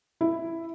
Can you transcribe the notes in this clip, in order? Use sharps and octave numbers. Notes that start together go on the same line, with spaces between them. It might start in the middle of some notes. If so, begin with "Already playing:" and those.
E4